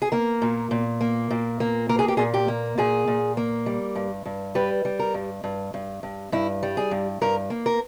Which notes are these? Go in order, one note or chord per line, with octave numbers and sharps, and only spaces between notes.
G#4
A#3 A#4
A#2
A#2
A#3
A#2
A#3
A#3 A#4
G#4
G4
A#2 G#4
G4
A#3
A#2 G#4
A#2
A#3
G3
G2
G2
G3 B4
G3
A#4
G2
G2
G2
G2
G2 E4
G3
G#4
G2
G2 A#4
A#3
A#4